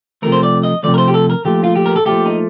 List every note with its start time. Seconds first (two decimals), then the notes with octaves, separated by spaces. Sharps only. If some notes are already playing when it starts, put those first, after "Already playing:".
0.22 C3 F3 A3 A#4
0.32 C5
0.43 D5
0.63 D#5
0.83 C3 F3 A3 D5
0.94 A#4
0.98 C5
1.08 G4
1.14 A4
1.30 A#4
1.45 A#2 F3 A3 G4
1.64 F4
1.76 G4
1.86 A#4
1.96 A4
2.05 A#2 F3 A3 G4
2.26 D#4